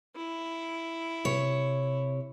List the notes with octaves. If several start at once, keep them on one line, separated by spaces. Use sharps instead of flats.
E4
C3 C#5